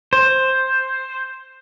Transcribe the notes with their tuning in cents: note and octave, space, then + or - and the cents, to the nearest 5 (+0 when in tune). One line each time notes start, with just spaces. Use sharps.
C5 +5